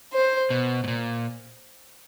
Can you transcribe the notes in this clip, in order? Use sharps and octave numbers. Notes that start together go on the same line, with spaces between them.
C5
B2
A2
A#2